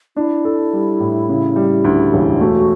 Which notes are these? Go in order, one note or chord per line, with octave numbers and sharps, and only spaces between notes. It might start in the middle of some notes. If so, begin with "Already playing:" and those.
D4 E4
A4
G3
A2
C#3
G3
D2
E1
A3 F#4